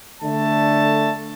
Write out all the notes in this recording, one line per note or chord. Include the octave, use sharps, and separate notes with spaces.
D3 A3 D4 A5